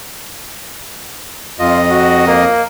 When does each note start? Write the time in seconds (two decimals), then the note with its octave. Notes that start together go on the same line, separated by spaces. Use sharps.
1.59 F2 F4 D#5
1.90 F#4
2.27 A#3